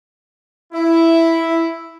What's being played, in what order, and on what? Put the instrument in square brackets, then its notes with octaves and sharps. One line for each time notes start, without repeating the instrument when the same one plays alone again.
[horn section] E4